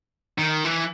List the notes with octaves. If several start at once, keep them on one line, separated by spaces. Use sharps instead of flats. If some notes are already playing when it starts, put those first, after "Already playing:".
D#3
E3